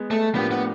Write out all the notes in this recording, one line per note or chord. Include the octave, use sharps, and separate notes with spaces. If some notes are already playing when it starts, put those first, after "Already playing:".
Already playing: G#3 B3
A3
A2 F3 A#3 B3 D4 G4
B3